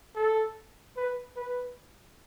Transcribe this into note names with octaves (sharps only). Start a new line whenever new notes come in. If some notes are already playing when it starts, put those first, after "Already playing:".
A4
B4
B4